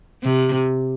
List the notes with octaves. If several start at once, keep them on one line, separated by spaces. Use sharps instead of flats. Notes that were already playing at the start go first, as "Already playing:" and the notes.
C3